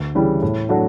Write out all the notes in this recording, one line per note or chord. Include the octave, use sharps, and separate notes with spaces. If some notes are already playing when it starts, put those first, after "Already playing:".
Already playing: D2
C#3 E3 G3
A2
F#3 A3 D4 F#4